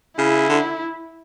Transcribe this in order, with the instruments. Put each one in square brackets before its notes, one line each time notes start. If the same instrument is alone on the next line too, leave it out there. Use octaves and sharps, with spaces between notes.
[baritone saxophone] C#3 [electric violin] E4
[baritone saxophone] D3